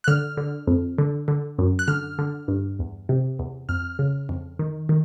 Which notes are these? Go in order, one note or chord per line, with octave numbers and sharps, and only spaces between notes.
F#6
D3 F6
D3
F2
D3
D3
F#2
F#6
D3 F6
D3
G2
E2
C3
E2
F2 F6
C#3
F2
D#3
D#3